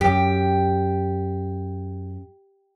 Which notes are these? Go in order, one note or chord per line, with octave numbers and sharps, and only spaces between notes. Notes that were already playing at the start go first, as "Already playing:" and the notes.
F#2 G4